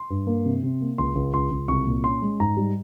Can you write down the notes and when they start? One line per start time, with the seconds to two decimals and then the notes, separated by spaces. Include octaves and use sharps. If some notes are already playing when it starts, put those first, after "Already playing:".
Already playing: C6
0.10 G2
0.27 A#3
0.45 C3
0.63 C3
0.81 A#3
0.98 C#2 C6
1.15 C#2
1.34 C#2 C6
1.51 C#2
1.68 C2 C#6
1.87 A#2
2.04 C#4 C6
2.22 G#3
2.40 G#2 A#5
2.57 G3